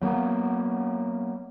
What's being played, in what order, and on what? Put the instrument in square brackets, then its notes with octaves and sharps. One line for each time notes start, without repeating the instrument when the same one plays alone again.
[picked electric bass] F#3 G3 A#3 B3